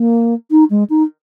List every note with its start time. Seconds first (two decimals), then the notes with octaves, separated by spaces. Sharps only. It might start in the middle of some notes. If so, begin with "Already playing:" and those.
Already playing: A#3
0.51 D#4
0.70 G#3
0.89 D#4